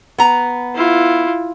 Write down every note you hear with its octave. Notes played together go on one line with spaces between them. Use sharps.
B3 A#5
E4 F4